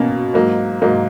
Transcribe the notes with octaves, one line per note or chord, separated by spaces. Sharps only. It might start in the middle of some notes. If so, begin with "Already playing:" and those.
Already playing: B2 A#3 C#4
G#2 F#3 A#3
G#2 F#3 A#3